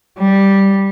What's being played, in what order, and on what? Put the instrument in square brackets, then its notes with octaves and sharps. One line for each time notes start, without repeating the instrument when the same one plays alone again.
[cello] G3